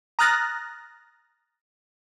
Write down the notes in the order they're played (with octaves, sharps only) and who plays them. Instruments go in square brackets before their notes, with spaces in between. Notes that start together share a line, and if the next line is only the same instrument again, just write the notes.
[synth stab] A#5 D#6 F6 F#6 A6 A#6